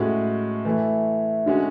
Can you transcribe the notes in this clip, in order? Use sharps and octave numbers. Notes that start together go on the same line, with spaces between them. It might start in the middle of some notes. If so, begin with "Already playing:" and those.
Already playing: A2 G#3 C#4 F#4
E3 A3 E4
D3 G#3 C#4 F#4